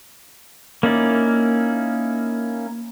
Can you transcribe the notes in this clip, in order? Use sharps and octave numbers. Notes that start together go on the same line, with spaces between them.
A#3 C#4 D#4 E4 D5